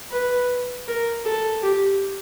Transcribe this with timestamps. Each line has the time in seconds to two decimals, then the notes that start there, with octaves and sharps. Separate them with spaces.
0.11 B4
0.88 A#4
1.25 A4
1.62 G4